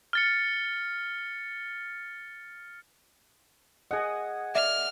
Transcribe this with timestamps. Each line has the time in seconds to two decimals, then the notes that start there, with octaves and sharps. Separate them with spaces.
0.13 F6 A6 C#7
3.91 G#4 D#5 F#5 G#5
4.55 D5 E5 D6 F6